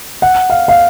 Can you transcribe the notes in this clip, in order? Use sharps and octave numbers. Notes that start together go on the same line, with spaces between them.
F#5
F5
F5